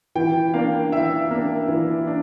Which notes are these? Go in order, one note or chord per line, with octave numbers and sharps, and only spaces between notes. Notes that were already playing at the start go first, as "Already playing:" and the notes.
E3 G5
A#3 D4 F5
E3 E5
A#3 D4
E3
D4